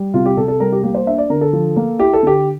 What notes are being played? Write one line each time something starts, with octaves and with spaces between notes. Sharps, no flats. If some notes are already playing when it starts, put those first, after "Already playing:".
Already playing: G3
C3 F4
G4
C3 A4
A4
G3 A#4
G4
A#3 G4
C5
D4 E5
D5
D3 A#4
A4
F3
A#3
E4 G4
A4
D3 G4